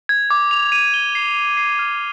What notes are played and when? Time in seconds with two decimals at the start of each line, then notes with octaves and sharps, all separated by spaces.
0.09 G#6
0.30 D6
0.51 F7
0.72 D#7
0.94 G7
1.15 C7
1.36 F7
1.57 C7
1.79 F6